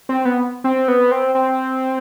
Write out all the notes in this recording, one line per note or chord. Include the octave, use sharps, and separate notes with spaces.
C4
B3
C4
B3
C4
C4